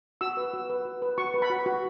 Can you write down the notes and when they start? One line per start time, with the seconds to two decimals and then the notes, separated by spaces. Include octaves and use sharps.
0.21 F#4 E6
0.37 B4
0.54 F#4
0.70 B4
0.85 F#4
1.02 B4
1.18 F#4 C#6
1.34 B4
1.42 B5
1.50 F#4
1.66 F#4